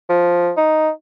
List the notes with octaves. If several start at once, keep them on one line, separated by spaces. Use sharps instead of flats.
F3
D#4